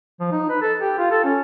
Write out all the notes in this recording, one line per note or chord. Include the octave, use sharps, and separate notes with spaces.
F3
D#4
B4
A4
G4
F4
A4
C#4